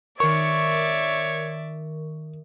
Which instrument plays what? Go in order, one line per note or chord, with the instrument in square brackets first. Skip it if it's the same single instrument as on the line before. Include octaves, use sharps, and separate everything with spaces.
[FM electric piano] D#3 A#4 [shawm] C#5 [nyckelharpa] D5 E5 [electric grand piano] C#6